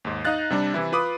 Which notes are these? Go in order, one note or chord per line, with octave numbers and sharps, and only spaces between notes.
D#2 G#2
D#4 D#5 F5 F#6 A6
C3 G3 D4
C3 E3 E4
F4 B4 B5 D6 D#6